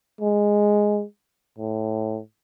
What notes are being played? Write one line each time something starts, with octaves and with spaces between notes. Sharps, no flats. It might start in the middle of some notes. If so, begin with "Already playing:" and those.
G#3
A2